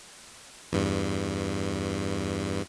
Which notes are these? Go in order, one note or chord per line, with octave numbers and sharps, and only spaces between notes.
E2 G2